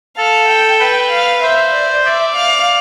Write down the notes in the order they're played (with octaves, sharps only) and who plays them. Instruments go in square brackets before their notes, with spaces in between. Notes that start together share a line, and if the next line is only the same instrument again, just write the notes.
[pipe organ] A4 [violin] F5
[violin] G5
[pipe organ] B4 [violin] G5
[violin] F5
[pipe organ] C5 [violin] E5
[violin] D5
[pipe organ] D5 [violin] E5
[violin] F5